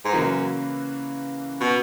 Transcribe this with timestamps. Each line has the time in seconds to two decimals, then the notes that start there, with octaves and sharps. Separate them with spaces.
0.05 G#2
0.13 F#2 C#3 E3 A#3 C#4 F#4
1.61 B2